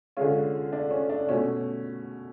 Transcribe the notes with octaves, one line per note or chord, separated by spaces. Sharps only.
D3 G#3 C#4 F4
D4
C#4
D4
B2 A3 C#4